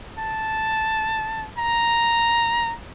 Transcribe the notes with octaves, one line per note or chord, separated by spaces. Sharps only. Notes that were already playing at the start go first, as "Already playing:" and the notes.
A5
A#5